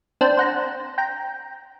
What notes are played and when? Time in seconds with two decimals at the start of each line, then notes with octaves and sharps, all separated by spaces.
0.21 C4 D4 C5 G5
0.37 C5 F#5 A#5
0.98 G5 A#5